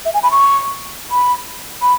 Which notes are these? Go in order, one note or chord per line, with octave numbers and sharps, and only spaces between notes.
E5
G#5
B5
C#6
B5
B5